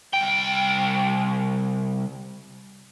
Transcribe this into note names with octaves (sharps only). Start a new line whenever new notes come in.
C2 G5